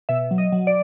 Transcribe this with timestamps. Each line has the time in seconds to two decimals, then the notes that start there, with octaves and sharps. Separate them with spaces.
0.09 B2 E5
0.31 F#3
0.38 D#5
0.52 F#3
0.67 D5